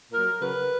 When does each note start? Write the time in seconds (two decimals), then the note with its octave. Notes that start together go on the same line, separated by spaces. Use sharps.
0.11 A#2 F#3 A#4
0.40 C#3 F#3 B4